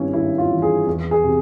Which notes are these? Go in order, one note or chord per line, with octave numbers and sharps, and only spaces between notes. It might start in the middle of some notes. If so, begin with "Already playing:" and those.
Already playing: G#1 G2 C#4 E4
G#1 E4
F4
E3
G#4
E2
G#4
C3